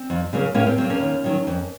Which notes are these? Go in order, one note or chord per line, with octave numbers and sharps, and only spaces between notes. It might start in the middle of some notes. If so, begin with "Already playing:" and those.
Already playing: C4
F2
C#3 F#3 A#3
A2 A#3 C#4
C4
F#3 A#3 C4
A#3 C#4
D#2
D#3 F#3
F2